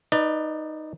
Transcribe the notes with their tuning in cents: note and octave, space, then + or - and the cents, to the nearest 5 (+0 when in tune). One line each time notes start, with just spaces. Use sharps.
D#4 +0 B4 +0 D5 +20